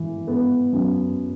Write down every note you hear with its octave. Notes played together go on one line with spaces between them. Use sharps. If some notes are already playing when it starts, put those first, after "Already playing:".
Already playing: E3
B3
F#2